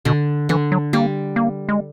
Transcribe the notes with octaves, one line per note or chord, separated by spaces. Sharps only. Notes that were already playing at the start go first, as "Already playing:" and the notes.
B2 D3
D3 E3
F#3
G3 A#3
A#3
G#3